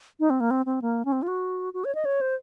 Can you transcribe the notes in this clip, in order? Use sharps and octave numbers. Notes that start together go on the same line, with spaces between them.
D#4
C4
A#3
C4
C4
A#3
C#4
C4
F4
F#4
F#4
C#5
D#5
C#5
C5